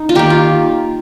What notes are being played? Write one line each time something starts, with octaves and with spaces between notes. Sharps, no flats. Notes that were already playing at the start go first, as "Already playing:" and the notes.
Already playing: D#4
F4
D#3 A#3 G4
F4